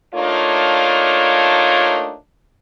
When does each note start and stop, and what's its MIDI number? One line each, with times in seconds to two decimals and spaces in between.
0.15 2.15 57
0.15 2.15 58
0.15 2.15 62
0.15 2.15 63
0.15 2.15 65
0.15 2.15 73